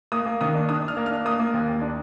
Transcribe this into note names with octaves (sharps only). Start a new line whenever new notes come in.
A#3 D#6
A#3
D#3 D#6
D4
D4 D#6
D4
F6
A#3
D4 F6
A#3 D#6
A#3
D#2
D#2
D4